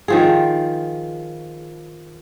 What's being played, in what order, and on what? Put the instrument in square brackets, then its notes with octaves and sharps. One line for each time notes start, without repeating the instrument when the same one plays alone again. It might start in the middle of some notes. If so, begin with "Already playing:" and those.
[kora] D#3 F3 G#4